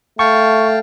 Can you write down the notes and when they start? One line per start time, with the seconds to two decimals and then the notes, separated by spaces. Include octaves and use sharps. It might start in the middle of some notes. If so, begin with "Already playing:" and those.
0.19 A3 F5 G5 A5 C#6